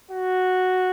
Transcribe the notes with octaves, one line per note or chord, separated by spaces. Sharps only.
F#4